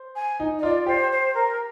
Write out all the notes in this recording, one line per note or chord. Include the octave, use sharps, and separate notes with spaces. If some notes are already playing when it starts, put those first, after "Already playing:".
Already playing: C5
G#5
D#4
D#5
F4 D5
G4 C5
C5
A#4